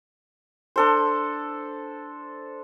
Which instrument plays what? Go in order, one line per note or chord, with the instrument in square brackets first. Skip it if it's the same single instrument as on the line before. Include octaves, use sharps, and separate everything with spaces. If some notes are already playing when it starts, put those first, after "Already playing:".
[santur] D4 A4 C5